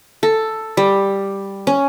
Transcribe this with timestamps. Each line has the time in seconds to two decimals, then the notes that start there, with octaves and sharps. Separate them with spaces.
0.23 A4
0.77 G3
1.67 C#4